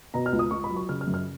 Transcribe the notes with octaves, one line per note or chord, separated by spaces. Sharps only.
B2 A#5
F6
C#2
D#6
C#2 C#6
B5
F#3
C#6
C#3 F6
F6
F#2
F6